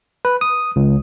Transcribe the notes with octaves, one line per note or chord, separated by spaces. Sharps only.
B4
D#6
C#2